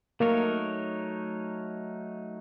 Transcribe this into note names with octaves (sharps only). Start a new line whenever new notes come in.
F#3 A3 A#3 D#4 A#4 C#5